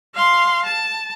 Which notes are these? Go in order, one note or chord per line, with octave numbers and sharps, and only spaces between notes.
F5 C6
A5